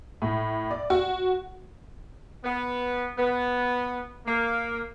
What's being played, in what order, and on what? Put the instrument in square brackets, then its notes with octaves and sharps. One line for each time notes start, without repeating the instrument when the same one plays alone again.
[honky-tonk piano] A2
D5
F#4
[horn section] B3
B3
A#3